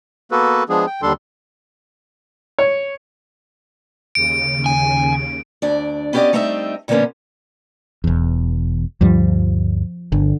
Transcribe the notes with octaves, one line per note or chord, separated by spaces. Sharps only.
A#3 B3 F#4 A4 B4
F3 G#3 B3 D4 G#4
G5
D#2 D3 G3 D4 A4 C6
C#5
D#2 C#3 D7
G#5
D2 D4 D5
B3 C#4 G4 A4 D5 D#5
G3 A3 C4 D#4 D#5 E5
A#2 D3 F3 A#3 B3 C#4
E1 E2
D2 G2 F3 G3
G1 D3